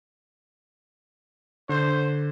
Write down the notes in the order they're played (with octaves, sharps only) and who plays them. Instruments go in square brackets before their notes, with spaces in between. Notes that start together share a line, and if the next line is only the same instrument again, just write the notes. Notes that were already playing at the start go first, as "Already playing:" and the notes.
[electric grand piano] D3 [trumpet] C5